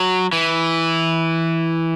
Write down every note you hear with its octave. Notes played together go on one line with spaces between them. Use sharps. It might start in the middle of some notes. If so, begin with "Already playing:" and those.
Already playing: F#3
E3